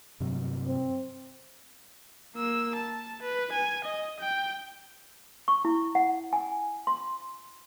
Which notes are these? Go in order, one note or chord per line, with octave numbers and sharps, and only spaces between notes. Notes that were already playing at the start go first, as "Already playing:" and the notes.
G2 C3 F#3
C4
A#3 E6
A5
B4
G#5
D#5
G5
C#6
E4
F#5
G#5
C6